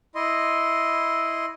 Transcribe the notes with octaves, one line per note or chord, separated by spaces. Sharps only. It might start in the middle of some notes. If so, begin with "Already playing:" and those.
E4 D#5 C6